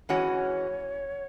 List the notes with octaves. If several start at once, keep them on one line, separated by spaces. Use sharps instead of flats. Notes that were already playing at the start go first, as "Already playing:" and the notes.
E3 G#3 C#4 F#4 C#5